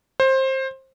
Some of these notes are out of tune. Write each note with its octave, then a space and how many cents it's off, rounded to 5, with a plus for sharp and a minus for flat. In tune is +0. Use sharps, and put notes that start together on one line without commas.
C5 +20